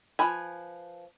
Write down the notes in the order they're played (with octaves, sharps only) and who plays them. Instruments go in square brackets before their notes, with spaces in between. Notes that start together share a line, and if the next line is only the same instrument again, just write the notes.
[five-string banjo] F3 B4 G#5